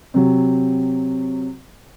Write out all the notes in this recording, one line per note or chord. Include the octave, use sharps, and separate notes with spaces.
C3 F#3